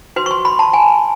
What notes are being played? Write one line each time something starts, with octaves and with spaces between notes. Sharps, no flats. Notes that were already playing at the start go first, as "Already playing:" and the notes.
F#4 B4 C6
C#6
C6
B5
A5
G#5